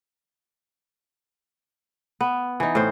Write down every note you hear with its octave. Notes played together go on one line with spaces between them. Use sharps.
B3
E3 D#4
A2 C5